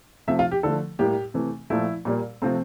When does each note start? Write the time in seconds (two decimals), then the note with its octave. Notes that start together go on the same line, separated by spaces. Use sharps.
0.28 C3 F3 A3 E5
0.39 F4
0.51 G4
0.63 D3 F3 A3 A4
0.99 A2 G3 A#3 G4
1.34 C3 E3 A3
1.70 A#2 F3 A3 E4
2.05 A#2 G3 A#3
2.42 C3 F3 A3 C4